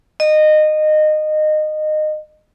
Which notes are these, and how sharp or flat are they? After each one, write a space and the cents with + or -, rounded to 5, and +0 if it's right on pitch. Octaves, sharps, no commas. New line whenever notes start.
D#5 -20